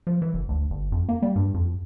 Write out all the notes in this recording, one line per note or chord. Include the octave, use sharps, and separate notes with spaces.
F3
E3
F#1
D2
G1
F2
A#3
G3
G2
F2